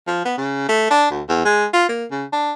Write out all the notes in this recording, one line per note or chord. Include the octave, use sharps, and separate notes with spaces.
F3
B3
C#3
A3
D4
D2
E2
G#3
F4
A#3
C#3
D4